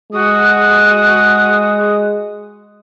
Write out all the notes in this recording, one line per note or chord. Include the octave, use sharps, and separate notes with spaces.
G#3 F#4 D#6